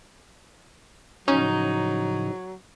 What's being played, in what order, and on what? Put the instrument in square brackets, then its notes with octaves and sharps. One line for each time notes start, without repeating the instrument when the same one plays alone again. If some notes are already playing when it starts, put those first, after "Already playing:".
[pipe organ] A2 C#3 F3 [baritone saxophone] F#3 [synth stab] C#4 [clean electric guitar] D#4